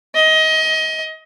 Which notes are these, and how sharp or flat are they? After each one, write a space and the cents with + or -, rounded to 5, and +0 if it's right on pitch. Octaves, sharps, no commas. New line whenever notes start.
D#5 +25